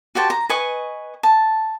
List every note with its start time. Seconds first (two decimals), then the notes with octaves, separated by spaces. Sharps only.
0.15 F#4 G4 C5 A5
0.30 A#5
0.49 B4 D#5 G#5 C#6
1.23 A5